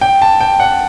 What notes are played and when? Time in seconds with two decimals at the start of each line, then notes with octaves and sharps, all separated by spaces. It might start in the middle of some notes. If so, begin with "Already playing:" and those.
0.01 G5
0.22 A5
0.40 G5
0.60 F#5